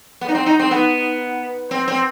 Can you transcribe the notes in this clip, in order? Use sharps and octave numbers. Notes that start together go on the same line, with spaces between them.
B3
D#4
C4
D#4
C4
B3
C4
C4